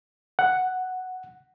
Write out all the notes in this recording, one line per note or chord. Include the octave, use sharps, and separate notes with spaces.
F#5